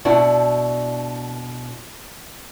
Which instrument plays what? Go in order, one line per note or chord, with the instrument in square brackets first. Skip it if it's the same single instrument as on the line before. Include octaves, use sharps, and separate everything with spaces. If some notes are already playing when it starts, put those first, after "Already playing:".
[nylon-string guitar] B2 D4 E4 F#4